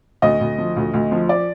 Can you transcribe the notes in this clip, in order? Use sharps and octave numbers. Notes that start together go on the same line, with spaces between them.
D2 D#5
D2
F3
D2
D2
F3
D5